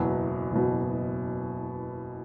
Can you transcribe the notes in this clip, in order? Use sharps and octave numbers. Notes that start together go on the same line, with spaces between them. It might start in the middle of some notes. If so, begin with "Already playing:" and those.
Already playing: F#1 E2 B2 F#3
F#1 E2 B2 F#3